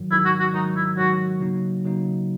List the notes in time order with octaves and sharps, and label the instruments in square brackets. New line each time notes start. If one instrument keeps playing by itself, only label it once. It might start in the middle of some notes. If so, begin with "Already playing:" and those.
Already playing: [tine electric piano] G#2 D#3 F#3
[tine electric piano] G#2 D#3 F#3 [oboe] E4
[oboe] F#4
F#4
[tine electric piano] G#2 D#3 F#3 [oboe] D#4
[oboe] E4
[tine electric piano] G#2 D#3 F#3 [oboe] F#4
[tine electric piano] C#3 F#3 A#3 D#4
C#3 F#3 A#3 D#4